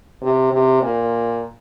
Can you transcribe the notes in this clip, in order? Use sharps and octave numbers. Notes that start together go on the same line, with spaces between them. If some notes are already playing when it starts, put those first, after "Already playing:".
C3
C3
A#2